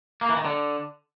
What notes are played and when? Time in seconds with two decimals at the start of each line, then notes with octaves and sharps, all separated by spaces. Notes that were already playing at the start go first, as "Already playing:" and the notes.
0.21 A#3
0.29 E3
0.37 D#3
0.45 D3